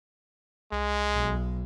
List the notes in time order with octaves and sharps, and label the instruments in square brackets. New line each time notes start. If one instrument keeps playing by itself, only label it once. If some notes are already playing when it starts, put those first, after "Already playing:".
[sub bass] C2 [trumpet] G#3
[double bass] B1